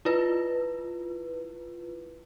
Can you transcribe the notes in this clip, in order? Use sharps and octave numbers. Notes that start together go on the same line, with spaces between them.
E4 F4 B4